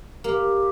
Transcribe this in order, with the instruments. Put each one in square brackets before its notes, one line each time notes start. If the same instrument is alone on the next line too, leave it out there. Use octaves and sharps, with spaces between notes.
[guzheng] A#3 [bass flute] G4